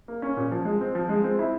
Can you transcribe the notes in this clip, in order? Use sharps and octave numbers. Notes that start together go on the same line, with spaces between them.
A#3
C#4
A#2
F3
G#3
C4
F3
G#3
C4
E4